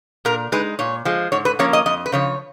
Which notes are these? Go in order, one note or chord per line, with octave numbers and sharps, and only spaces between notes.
A#2 A#4
G#3 D#4 B4
A#2 C#5
F3 G#3
G#2 C#5
B4
F3 A#3 C#4 C#5
D#5
F2 D#5
B4
C#3 F3 C#5